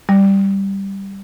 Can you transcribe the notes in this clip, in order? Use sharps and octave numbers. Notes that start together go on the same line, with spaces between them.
G3